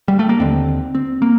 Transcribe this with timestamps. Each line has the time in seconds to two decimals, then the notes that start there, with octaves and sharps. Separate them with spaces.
0.08 G3
0.19 A3
0.29 A#3
0.40 D#2 D3 C4
0.95 C4
1.22 A#3